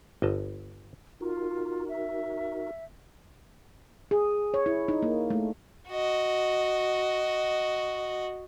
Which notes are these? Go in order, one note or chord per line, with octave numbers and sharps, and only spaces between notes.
G1 D#5 A5
D#4 F4 F#4 A#4
E5
G#4
C#5
E4
D#4
A#3
A3
F#4 D#5